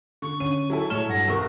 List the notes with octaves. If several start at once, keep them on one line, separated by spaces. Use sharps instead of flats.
D3 C#6
D3 C#4 D#7
F#3 E4 A4
A2 G#3 C#5 C#6 F6 E7 G7
G2 F#5 A#6
B1 E2 C3 A4 A#4 C#6